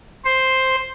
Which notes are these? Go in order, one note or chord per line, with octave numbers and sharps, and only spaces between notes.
C5